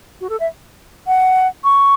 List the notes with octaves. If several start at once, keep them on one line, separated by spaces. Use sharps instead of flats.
F#4
A4
E5
F#5
C#6